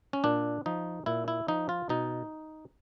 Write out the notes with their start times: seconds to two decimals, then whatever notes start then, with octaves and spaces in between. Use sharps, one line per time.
0.13 C#4
0.24 A#2 D4
0.66 F3 D#4
1.06 A#2 E4
1.28 E4
1.48 F3 D#4
1.69 F4
1.89 B2 D#4